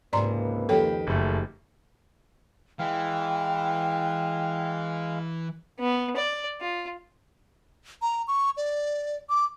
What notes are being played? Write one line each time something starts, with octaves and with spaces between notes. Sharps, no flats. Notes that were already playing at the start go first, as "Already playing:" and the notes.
C#2 G#2 C3 A#3 B4 D5 A#5 C6
F2 D#3 G4 A4 C#5 G5
F#1 A3
E3 G#3 F5 G5
B3
D5
F4
A#5
C#6
D5
D6